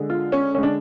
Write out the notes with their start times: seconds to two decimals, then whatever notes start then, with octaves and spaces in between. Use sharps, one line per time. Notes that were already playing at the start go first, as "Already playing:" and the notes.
Already playing: D3 G#3
0.10 F4
0.32 C#4
0.54 D3 G#3 C#4
0.63 D4